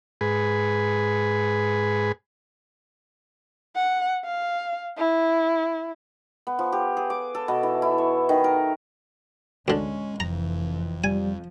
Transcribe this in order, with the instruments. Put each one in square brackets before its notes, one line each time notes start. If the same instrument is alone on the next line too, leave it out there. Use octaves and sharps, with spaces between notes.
[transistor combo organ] G#2 G#4 B4
[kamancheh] F#5
F5
E4
[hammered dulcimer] B3
F3
G4
G#4
D6
A4
B2
E3
E4
C#6
D#3
A#4
[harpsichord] D2 D3 [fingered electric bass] G#3 [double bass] C#4
[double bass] F1 E3 [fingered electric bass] F2 [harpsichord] A#5
[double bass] F3 [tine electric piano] G3 [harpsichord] G#5